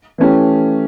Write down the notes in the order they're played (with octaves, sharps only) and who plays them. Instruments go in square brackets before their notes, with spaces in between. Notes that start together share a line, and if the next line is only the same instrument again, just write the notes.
[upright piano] E3 A3 C#4 G4